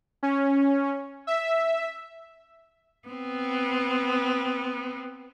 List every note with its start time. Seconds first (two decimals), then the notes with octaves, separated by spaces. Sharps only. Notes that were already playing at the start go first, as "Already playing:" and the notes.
0.23 C#4
1.27 E5
3.08 B3 C4